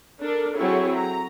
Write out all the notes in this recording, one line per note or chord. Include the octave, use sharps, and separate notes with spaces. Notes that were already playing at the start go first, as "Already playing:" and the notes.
D4 A4 A#4
F#3 C4 E4 G#4 A4 C#5
A#5